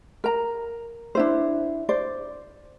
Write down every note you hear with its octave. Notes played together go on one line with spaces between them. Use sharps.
A#4 A#5
D4 E4 C5
C5 D5